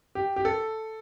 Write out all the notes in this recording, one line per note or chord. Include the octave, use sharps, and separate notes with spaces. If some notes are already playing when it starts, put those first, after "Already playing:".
G4
G4
A4